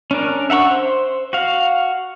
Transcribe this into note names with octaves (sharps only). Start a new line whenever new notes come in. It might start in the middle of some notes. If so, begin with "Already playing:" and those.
C#4 D4 A#4
E5 F#5 A#5 C#6 E6
C5
F#4 F5